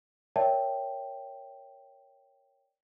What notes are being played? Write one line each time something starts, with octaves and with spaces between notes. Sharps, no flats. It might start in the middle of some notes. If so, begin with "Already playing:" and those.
A#4 C#5 D5 E5 G5 A5